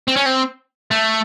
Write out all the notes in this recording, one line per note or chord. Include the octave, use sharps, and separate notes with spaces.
C4
C#4
C4
A3